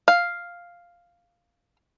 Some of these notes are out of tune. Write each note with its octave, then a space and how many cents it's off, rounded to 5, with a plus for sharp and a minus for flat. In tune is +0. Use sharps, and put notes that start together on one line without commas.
F5 +0